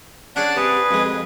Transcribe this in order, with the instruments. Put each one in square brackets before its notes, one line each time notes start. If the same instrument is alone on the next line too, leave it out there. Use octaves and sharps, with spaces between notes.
[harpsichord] C#4 D4 G#4 [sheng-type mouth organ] D5 F#5 A5
[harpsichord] C3 [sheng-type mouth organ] G#4 B4
[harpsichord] F2 G#3